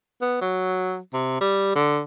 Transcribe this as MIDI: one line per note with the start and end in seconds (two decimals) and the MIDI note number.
0.21 0.40 59
0.41 0.98 54
1.14 1.38 48
1.41 1.73 55
1.75 2.00 50